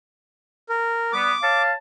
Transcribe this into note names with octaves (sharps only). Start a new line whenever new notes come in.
A#4
G3 B3 D6
C#5 F5 A5